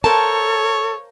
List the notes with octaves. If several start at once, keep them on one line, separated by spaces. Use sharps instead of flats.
A4 A#4 C5 C#5 F5 A5